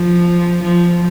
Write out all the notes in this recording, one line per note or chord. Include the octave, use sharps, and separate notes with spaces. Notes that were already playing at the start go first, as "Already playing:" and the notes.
Already playing: F3
F3